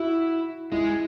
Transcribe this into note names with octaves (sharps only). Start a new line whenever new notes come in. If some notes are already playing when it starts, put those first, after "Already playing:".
Already playing: E4 F#4
G#3 E4